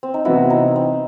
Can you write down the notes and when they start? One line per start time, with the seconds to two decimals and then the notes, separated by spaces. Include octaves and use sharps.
0.03 C4
0.14 D#4
0.25 C3 E3 B3 E4 F#4 B4
0.50 D#4
0.76 C4